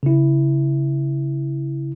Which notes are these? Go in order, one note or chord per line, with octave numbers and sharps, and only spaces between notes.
C#3 E4